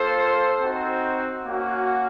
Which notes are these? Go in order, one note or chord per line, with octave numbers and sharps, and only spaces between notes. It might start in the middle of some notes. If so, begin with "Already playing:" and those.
Already playing: A#3 F4 A4 C5
C4 D#4 F#4
A#3 C#4 F#4